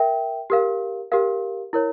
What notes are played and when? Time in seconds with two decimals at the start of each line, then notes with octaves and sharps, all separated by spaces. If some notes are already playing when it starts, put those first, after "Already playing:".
Already playing: A#4 E5 G5
0.50 G4 A#4 F5
1.12 G4 A#4 F5
1.73 E4 A#4 C#5